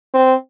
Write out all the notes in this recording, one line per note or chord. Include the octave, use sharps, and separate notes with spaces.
C4